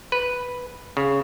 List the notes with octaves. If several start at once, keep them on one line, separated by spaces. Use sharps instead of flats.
B4
C#3